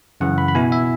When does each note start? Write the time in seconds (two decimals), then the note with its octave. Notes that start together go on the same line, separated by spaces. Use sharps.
0.20 F#2 C#3 E3 F#5
0.38 B5
0.48 B5
0.55 B2 B3 E4 G#5
0.72 E5